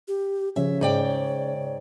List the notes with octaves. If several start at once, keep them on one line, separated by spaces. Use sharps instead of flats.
G4
C#3 F3 C#4 C#5 E5
G#2 C#3 D5 G5